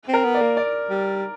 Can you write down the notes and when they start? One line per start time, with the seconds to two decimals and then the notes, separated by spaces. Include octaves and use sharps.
0.08 C4
0.14 A#4
0.24 B3
0.35 D5
0.41 A#3
0.57 D5
0.90 G3